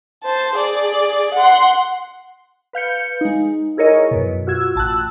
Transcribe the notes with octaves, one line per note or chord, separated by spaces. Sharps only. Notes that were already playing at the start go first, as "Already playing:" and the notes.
C5 A5
G#4 D5
F#5 C6
B4 F5 G6 C#7
G#3 D#4
E4 G#4 A#4 C#5 D#5
F#2 B2
F4 F#4 E6 G#6
A1 A5 E6 F#6